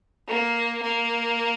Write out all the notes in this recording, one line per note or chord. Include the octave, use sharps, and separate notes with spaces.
A#3
A#3